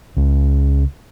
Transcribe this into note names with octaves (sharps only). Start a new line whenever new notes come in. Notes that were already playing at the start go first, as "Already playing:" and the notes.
C#2